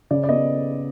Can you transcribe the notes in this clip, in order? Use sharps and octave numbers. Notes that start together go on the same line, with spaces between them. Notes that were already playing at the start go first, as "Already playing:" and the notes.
C#3 D5
D5
B3 D#5